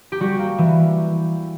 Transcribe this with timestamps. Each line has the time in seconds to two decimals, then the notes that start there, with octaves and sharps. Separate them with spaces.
0.12 G4
0.20 G3 F#4
0.39 A#3
0.58 E3